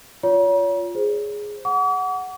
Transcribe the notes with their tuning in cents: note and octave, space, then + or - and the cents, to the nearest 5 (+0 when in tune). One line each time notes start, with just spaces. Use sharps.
F4 +0 C#5 +35 A#5 +40
G#4 +0 C5 +0
F#5 +0 D6 -45